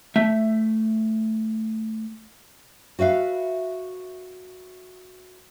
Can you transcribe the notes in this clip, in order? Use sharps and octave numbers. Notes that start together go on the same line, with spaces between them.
A3 E5
F#4 B4 E5 F5